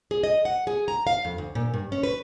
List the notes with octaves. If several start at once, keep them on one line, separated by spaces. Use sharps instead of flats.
G#4
D#5
F#5
G#4
A#5
F5
F2
D2
A#2
G2
C#4
B4